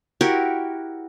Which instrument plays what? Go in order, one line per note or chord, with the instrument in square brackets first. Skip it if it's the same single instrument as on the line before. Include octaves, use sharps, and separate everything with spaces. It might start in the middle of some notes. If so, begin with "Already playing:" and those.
[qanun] E4 F#4 G4 A#4